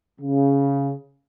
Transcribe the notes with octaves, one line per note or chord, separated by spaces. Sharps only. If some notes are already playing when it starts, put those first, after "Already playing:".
C#3